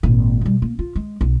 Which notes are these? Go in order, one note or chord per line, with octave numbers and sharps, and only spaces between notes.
G#1 A#2
B2 G3
A#3
F4
G#3
B1